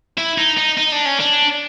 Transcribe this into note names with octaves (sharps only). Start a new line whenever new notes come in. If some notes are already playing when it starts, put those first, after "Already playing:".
E4
D#4
D#4
D#4
D4
C#4
D4